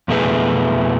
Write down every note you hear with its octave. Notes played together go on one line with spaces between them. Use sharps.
F2 B2 A3 E4 G#4 B4